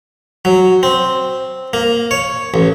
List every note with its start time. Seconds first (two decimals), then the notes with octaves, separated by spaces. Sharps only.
0.45 F#3
0.83 C4
1.73 A#3
2.11 C#5
2.54 A1